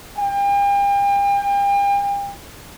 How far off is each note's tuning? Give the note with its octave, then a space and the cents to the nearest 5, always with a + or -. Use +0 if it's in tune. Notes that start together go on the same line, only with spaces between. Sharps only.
G5 +40